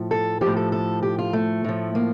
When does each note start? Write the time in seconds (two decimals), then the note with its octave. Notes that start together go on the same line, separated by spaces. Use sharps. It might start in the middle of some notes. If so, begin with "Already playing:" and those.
Already playing: A2 F3
0.11 A4
0.41 F3 G4
0.47 A2
0.57 A4
0.72 A4
1.03 G4
1.19 F4
1.33 A3
1.64 A2 F3
1.95 A#3